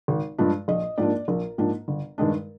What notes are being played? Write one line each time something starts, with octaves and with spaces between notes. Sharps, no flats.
G#1
G2 F3 G#3 D4
A#1 D#5
G#2 F3 A#3 D4 D5
A#1 A#4
G#2 F3 A#3 D4
G1
G2 D#3 G#3 D4